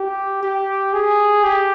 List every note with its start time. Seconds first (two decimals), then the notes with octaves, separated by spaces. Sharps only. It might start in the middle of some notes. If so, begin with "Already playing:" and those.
Already playing: G4
0.43 G4
0.93 G#4
1.44 G4